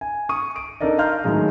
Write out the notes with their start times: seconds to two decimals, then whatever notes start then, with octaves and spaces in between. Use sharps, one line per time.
0.01 G#5
0.29 C#6 D#6 D#7
0.56 D7
0.80 D4 D#4 A4 A#4 D5 D#5
0.98 F5 A#5 C6 F6 G6
1.24 A2 D#3 F#3 G#3